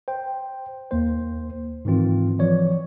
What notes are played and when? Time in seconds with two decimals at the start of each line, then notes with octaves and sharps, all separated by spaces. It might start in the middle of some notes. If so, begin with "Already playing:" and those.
0.08 C5 G5
0.91 D#2 A#3 C5
1.85 G#2 D#3 E3 C4 F4
2.39 E3 F3 C#5 D5